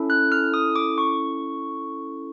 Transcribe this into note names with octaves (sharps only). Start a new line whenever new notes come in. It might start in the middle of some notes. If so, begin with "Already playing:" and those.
Already playing: C#4 E4 A4
F#6
F6
D#6
D6
C#6